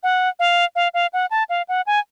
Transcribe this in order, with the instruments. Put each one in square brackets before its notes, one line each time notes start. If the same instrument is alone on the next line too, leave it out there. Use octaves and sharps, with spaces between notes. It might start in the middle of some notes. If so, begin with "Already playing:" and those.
[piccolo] F#5
F5
F5
F5
F#5
A5
F5
F#5
G#5